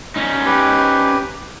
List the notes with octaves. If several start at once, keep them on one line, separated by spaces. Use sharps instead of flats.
C#4 D#4
G4 B4